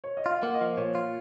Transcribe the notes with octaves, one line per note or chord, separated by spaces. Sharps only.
C#5
D#5
F4
F5
A#3 F#5
D#5
F3 F5
A#2 C#5
F4